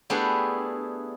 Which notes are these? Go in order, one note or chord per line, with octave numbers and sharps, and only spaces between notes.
A3 B3 D4 E4 G4 G#4